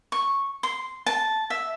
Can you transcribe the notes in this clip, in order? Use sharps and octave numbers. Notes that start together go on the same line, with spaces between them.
C#6
C6
A5
E5